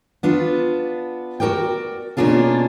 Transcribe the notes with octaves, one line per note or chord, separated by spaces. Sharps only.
B3 D4 F4
F#4 A4 A#4 D5 G5
B2 A#3 C#4 D4 F4 G#4